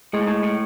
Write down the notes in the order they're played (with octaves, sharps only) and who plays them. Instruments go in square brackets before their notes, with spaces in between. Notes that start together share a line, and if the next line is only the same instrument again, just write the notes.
[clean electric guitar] A2 [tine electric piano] G#3
[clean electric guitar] G#2
A2
A2